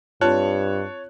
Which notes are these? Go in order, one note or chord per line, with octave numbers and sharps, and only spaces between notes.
G2 C4 F4 C#5 A5 F#6